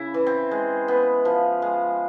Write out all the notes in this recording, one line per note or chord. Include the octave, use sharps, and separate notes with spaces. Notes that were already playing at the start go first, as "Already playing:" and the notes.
Already playing: C#3 E4
E3
C4
G#3
B3
F3
G#3